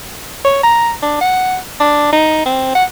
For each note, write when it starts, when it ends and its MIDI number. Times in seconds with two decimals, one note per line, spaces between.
0.44 0.61 73
0.63 0.91 82
1.02 1.17 62
1.21 1.57 78
1.80 2.07 62
2.13 2.41 63
2.46 2.71 60
2.75 2.84 78